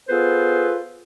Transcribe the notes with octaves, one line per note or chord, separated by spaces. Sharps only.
B3 F4 G#4 A4 B4 C5